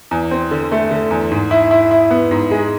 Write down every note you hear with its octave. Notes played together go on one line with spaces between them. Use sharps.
E2
C4
D3
A3
D3
E2
G#2
E4
E4
E4
B3
G#2
G#3